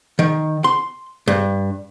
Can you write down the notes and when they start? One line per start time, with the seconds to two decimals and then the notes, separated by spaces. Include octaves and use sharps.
0.19 D#3
0.64 C6
1.28 G2